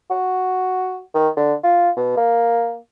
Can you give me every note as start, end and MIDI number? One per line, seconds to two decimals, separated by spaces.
0.10 0.99 66
1.15 1.29 51
1.37 1.54 50
1.64 1.90 65
1.97 2.12 47
2.17 2.76 58